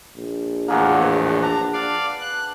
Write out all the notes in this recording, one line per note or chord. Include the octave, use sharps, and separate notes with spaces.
A#1
E2 A2 A#3 G#4 F#5
B4
D4 A#5
D5 F5
F#6